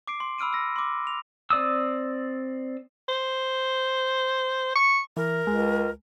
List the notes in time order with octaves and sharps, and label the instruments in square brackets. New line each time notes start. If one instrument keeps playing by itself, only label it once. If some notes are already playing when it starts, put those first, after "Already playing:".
[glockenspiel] D6 C7 D7
C6
B5 E6 F6 D7 D#7
E6 A#6 C#7
C6 D6
F7
[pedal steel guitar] C4 D5 D#6 E6
[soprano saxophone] C5
C#6
[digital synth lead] E3 [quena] A#4
[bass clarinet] C#2 [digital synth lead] G#3